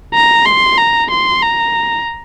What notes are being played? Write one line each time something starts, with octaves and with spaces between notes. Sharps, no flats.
A#5
C6
A#5
C6
A#5